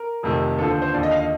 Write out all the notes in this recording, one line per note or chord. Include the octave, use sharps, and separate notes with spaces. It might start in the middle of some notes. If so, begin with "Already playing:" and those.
Already playing: A#4
F1 F2 C3 D#3
D#2 D3 F3 A4
C5
C5
D#2 D3 F3 D5
D#5
F5
D#5